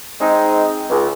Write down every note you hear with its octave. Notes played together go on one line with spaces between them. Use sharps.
G#3 C4 D#4
C#2